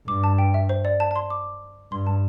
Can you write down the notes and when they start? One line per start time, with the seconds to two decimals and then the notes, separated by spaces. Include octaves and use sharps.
0.08 G2 D6
0.24 A5
0.38 G5
0.54 E5
0.69 C5
0.85 D5
1.00 A5
1.11 A5
1.16 C6
1.30 D6
1.92 G2 C6
2.07 A5